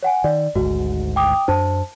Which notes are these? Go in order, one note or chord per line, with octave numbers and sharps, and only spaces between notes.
C#5 F#5 G#5
D#3 D5
G#1 D2 G#2 F#4
G5 D6 D#6
F#2 D4 C5 A5